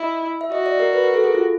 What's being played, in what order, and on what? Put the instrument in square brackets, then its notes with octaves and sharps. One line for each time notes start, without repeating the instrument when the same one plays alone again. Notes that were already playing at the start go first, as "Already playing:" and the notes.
Already playing: [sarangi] E4 [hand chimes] D#5
[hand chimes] E5
[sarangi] F#4 [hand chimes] D#5
[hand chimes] D5
A#4
B4
A#4
A4
G#4
F4